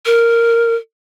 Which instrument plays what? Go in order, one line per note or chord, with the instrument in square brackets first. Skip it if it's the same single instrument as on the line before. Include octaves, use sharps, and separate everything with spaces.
[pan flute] A#4